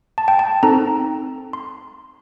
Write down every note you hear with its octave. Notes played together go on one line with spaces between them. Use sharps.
A5
G5
A5
C4 D#4 A4 A#5
C6